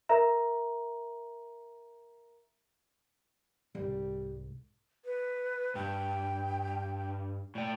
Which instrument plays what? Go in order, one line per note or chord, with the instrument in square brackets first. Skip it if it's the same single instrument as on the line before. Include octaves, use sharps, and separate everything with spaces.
[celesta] A#4 E5 A#5
[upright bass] C2 G#2 [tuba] G3
[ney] B4
[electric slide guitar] G2 [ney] G5
[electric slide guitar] A2 G5 [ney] D5